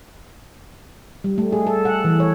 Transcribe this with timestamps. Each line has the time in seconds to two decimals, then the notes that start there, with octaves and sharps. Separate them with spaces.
1.24 G3
1.38 A3
1.53 G#4
1.67 A4
1.85 F#5
2.04 E3
2.20 C#5